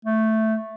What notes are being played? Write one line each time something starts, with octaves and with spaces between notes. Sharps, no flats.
A3